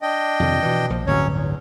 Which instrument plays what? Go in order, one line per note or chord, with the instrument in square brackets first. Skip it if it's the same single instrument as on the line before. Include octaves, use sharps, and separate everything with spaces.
[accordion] D4 D#5 G5
[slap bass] F2 C3 D#3
B2 E3
A#1 F3
[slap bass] D1 G1 [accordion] F#3 C#4 C#5
[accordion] E2